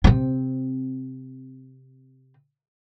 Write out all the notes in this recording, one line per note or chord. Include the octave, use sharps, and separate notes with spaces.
C3 C4